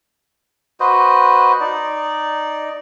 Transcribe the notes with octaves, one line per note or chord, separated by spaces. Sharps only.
F#4 B4 C5 D#5
D#4 D5